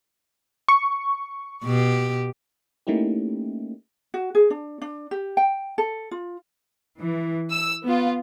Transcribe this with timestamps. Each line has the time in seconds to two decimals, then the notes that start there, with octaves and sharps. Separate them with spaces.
0.68 C#6
1.64 B2 G4
2.87 A3 A#3 C#4 D#4 E4 G4
4.14 F#4
4.35 G#4
4.50 D4
4.82 D4
5.11 G4
5.37 G5
5.78 A4
6.11 F4
6.98 E3
7.50 E6
7.84 B3 F4